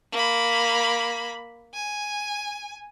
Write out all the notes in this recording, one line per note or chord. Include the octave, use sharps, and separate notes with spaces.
A#3 B5
G#5